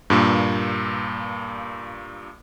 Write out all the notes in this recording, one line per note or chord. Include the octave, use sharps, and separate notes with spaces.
G2 A#2 A#3